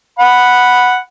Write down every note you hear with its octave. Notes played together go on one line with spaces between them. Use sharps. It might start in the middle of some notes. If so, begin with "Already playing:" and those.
F#5 B5